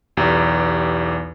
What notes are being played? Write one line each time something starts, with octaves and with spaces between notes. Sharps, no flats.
B1 E2 G4